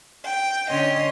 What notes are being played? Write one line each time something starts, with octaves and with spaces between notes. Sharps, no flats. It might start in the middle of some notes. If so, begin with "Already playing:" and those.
G5
D3 C#4 C#5 D#5 C6